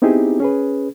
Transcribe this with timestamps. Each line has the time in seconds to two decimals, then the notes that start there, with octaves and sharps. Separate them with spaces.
0.02 B3 C4 D#4 E4 G4 G#4
0.40 C#4 G#4 B4